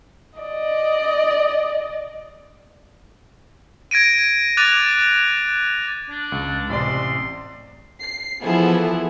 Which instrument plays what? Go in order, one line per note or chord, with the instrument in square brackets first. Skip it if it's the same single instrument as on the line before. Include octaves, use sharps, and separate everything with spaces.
[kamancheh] D5 D#5
[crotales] G#6 A#6 D7 D#7
D6 F#6 A6 D#7 F7
[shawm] D4
[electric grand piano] C#2
[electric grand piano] A1 C3 D5 [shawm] C6
[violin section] C7
[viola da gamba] E3 F3 E4 [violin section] B3 G#4 A4